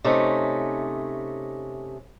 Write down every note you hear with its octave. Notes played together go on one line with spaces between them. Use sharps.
C3 A3 C#4 D#4